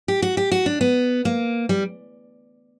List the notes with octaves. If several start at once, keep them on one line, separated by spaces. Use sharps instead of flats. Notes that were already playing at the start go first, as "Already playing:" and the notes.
G4
F#4
G4
F#4
D4
B3
A#3
G3